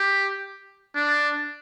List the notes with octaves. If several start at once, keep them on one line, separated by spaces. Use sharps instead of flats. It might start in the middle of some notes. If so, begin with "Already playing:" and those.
Already playing: G4
D4